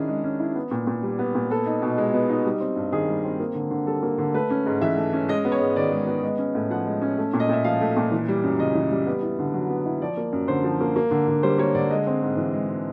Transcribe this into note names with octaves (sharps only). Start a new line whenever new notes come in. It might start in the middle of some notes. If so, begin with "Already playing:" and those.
Already playing: D#3 C#4 D4 E4 G#4
G#3
C#4
E4
B3
A#2
A#2
G3
B3
A#2
B3 A4
D#4
B2
G#3
B3
D#4
G3
C4
G2
D#3 G#4
G3
C4
A#3
D3
D3
G3 A4
A#3
D3
A3 B4
C#4
G#2
E3 E5
A3
C#4
G#3 D#5
B3
C#5
G#2
D#3 D5
G#3
B3
G#3
C#4
A2
F3 F#5
G#3
C#4
A3
A#2
D#5
A#2 E5
F3 F5
A3
A#2
E3
G3
F#2
C#3 D#5
E3
G3
B3
E4
D3
F#3
B3
E4
F3 D5
A#3
F#2
D3 C5
F3
A#3
A#3
D3
D3
G3 C5
A#3 C#5
D3 D5
G#3 D#5
C4
G#2
E3
G#3
C4